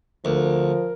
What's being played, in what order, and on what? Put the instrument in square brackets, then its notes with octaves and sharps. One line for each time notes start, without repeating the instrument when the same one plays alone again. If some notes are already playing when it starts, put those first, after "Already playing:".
[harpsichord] D2 [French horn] F3 [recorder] A#4